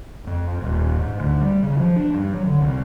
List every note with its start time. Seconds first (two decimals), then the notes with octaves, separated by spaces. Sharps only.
0.27 F2
0.62 D#1
0.98 G#2
1.20 D2
1.41 G3
1.63 C#3
1.80 F3
1.96 D4
2.15 G2
2.34 F#3
2.46 D3
2.61 C2